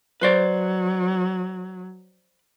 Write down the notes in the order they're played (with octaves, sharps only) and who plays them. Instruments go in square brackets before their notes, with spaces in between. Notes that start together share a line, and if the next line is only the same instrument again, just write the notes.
[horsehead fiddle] F#3 [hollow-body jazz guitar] B4 C5 D5